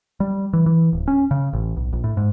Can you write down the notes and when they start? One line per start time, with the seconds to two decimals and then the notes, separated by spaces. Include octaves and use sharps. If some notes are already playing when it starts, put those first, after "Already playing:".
0.20 G3
0.53 E3
0.66 E3
0.93 D1
1.08 C#4
1.31 C#3
1.53 A1
1.77 B1
1.93 A#1
2.04 A2
2.17 G#2